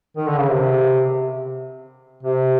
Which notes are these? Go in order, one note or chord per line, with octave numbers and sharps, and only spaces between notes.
D#3
D3
C#3
C3
C3